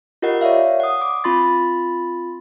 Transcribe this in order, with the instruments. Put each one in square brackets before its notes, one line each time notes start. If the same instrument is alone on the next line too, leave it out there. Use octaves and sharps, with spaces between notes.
[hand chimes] F4 G4 A#4 D#5 F#5
C#5 D5 E5 F5
F#5 D#6
D6
C4 F4 B5 C6 A6